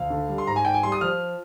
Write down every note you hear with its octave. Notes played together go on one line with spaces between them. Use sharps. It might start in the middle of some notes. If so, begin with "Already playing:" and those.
Already playing: D2 F5
D3
G3
C6
G#2 A#5
G#5
G#2 G5
G#5
G3 C6
D#6
F3 F6